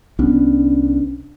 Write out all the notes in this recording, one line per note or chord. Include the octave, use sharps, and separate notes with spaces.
C2 B3 C#4 D4